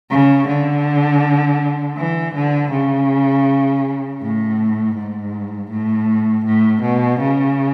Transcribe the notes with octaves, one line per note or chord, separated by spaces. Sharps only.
C#3
D3
E3
D3
C#3
A2
G#2
A2
A2
B2
C#3